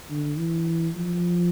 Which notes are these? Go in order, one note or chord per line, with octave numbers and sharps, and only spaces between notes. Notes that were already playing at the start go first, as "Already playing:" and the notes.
D3
E3
F3